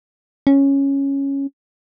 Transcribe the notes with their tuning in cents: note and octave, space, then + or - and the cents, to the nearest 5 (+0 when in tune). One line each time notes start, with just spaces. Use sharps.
C#4 -5